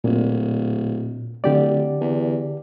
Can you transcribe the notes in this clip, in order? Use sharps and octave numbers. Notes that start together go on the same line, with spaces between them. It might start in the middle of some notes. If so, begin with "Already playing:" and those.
D1 A#2
D1 D3 G4 D5
E2